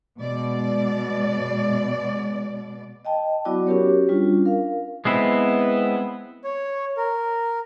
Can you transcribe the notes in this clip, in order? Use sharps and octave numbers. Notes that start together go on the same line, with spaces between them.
B2 G#3 D5
D#5 G5 A5
F#3 B3 E4 F#4 D5 D6
C#4 F#4 G4 A#4 C#5
G3 C#4 D4 F4
A#4 F5
G#3 B3 C4 E4
C#5
A#4